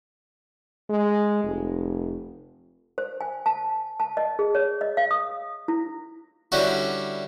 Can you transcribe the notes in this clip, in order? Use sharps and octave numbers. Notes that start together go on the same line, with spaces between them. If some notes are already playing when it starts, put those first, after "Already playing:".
G#3
F1
C5
G#5
A5
A5
D#5
G#4
C#5
D#5
F5
D#6
E4
D3 G3 C#4 E4 F#4